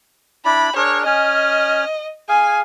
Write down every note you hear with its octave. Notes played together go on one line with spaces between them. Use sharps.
D4 E4 D5 B5
D4 G#4 A#4 C#5
C#4 D#5 G#5 F6
G#4 F5 G#5